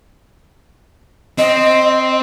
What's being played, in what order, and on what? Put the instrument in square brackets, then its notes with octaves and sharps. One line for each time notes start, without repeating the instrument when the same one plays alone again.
[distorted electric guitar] C4 [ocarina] D#5